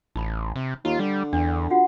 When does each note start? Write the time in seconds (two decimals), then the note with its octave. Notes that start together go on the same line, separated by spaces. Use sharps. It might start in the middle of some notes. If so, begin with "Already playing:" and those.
0.16 A1 D#4 B5
0.56 C3
0.85 D#2 F4
0.99 D3 G3
1.33 E2 D4
1.70 F4 F#4 F#5